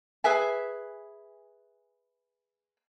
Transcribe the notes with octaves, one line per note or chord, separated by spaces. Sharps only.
G#4 B4 E5 G#5